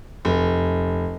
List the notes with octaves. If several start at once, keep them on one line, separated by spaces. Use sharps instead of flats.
F1